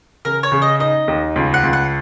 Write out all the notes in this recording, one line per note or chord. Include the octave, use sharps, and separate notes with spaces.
C#3 A#4
C#5
C#3
D#5
D#4 D#5
D#2
C#2
F#5
C#2
F#5